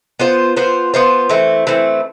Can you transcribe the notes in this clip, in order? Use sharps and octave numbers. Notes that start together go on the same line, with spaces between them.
B3 F4 C5
B3 F4 C5
B3 F4 C5
E3 A3 C4
E3 A3 C4